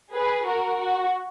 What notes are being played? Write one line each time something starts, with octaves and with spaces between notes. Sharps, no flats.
G#4 B4
F#4 A#4
F#4